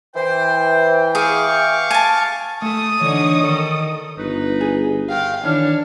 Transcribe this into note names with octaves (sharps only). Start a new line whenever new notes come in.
E3 C5 G5
G#4 F5 C#6 D6
G#5 A5
A3 A4 D#6
D3 E3 D#4 C#5
D#3 A4 A#4
G1 D#4 B4
G#4
D#3 F5 G5
D#3 E3 D4 C#5 F6